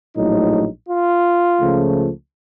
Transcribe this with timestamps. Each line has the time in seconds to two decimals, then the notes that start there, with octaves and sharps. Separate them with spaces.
0.17 A#1 A2 F#3 A3 D#4
0.89 F4
1.60 C#2 C#3 F3 A3